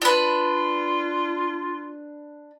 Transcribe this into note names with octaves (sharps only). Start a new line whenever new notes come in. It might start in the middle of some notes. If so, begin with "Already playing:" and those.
D4 F4 B4